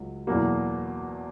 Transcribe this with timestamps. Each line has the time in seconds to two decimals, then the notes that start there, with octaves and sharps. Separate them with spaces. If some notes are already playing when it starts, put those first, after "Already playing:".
Already playing: C#2 F#3
0.27 E2 B2 F#3 A#3